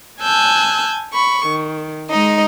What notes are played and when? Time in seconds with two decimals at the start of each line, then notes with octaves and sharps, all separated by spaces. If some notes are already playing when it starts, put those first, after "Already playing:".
0.21 G#5 A5 E6 F#6 G6
1.13 B5 C#6
1.46 D#3
2.09 G#3 D#4 D#5